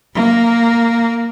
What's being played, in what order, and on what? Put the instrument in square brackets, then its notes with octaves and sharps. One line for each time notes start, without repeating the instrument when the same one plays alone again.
[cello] A#3